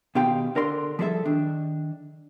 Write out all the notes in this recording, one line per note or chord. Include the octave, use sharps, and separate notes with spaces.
B2 D#3 G4 F5 G5 C6
D3 A#4 D5 C6
F3 G3 G#4 A4 E5
D#3 D4